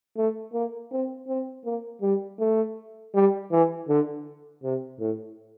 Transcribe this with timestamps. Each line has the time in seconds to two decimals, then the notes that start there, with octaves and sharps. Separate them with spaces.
0.17 A3
0.53 A#3
0.91 C4
1.28 C4
1.65 A#3
2.02 G3
2.39 A3
3.14 G3
3.52 E3
3.88 D3
4.63 C3
5.00 A2